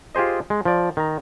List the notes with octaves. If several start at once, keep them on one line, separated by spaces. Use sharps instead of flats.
F4 G4 G#4 C5 D#5
G#3
F3 D5
D#3 A#5